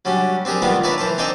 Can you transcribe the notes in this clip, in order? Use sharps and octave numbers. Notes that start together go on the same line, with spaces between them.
F#3 G3 C#4 D4
C4 D4 G4 G#4 A#4
D#3 G3 B3 C4 D4 F4
D4 A#4 B4 C#5 D5 E5
E3 A#4 C5 A5
C4 D4 D#4 C5 D#5 G5